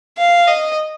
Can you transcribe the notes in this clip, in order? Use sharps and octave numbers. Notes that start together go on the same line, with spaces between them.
F5
D#5